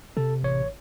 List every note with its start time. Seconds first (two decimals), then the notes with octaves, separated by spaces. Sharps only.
0.17 C3 A4 A5
0.43 A1 C#5